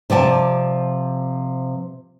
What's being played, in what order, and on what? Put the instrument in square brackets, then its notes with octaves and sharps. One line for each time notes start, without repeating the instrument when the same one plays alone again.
[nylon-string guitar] C3 F3 D5 G5 A5